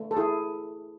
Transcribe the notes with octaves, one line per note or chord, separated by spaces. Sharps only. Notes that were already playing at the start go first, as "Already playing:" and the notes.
Already playing: A3
A4
E4 G#4